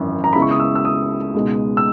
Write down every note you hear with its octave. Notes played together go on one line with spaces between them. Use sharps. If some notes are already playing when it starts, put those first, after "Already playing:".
Already playing: G#1 F#2 E3
A#5
C#2 C#3 G#3 B3 E4 B5
C#6
D#6
E6
E6
D#6
C#2 B2 G#3 D#4
E6